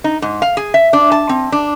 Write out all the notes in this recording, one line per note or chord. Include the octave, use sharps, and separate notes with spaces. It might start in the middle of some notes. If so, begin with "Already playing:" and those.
D#4
G#2
F5
G#4
E5
D4
A5
C4
D4